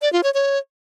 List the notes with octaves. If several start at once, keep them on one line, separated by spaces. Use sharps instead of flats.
D5
F4
C#5
C#5